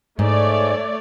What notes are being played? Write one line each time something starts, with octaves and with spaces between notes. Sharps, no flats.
G#2 A3 C#5 D5